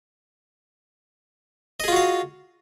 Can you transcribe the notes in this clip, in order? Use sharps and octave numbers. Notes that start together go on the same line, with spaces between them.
F4 F#4 G#4 D#5 F5